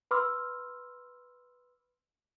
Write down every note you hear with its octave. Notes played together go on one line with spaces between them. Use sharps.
B4 B5 C6 D6 E6 F6